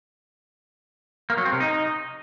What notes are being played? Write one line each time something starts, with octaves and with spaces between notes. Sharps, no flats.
A#3
F#3
C4
C3
D#4